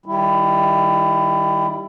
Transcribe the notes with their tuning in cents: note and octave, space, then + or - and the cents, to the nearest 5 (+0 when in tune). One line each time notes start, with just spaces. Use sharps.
D#3 +0 G3 +0 E4 +20